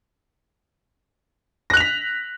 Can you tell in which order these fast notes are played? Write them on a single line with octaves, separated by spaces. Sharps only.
A#6 F#6 F7 B6